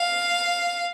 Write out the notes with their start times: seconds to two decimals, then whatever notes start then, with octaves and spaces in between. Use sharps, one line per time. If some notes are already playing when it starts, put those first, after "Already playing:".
Already playing: F5